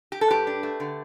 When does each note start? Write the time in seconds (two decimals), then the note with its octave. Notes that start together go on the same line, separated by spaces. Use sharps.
0.12 G4
0.21 A4
0.31 G2 G4 B4
0.47 D4
0.63 A3
0.80 D3